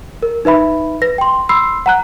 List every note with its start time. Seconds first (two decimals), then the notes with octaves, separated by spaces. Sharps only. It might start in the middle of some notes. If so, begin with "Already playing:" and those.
0.22 A#4
0.45 D#4 B4 E5 B5
1.02 B4 A#6
1.18 G5 C6
1.49 B5 C6 E6 C7
1.86 F#5 A#5 F#6